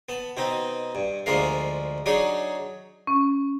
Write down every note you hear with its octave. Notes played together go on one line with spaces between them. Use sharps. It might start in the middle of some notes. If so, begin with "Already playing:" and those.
B3 A5
B2 C4 D#4
G2
D2 F3 G#3 D4 A#4 F5
F#3 D4 D#4 G#4 C#5
C#4